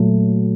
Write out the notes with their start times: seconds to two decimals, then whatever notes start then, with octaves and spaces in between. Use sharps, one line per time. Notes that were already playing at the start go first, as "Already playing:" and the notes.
Already playing: A#2 F#3 A3